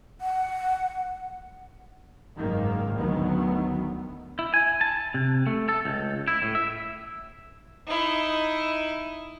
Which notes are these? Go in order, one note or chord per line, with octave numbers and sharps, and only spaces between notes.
F#5
F#1 G#2 D#3 A#3
D2 D#3 F#3 B3
E4
G#5
A5
C3
A3
A4
C#2
E4
A2
E5
D#4 E4